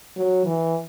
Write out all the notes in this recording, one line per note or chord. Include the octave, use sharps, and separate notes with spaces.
F#3
E3